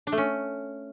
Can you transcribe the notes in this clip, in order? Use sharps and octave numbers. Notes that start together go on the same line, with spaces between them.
D4
A3
C#4